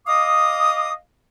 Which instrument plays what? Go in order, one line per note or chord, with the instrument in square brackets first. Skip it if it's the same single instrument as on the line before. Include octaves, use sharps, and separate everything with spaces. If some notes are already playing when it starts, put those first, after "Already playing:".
[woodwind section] D#5 F5 D6 D#6